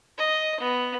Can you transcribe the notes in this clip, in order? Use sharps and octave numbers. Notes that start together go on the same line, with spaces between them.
D#5
B3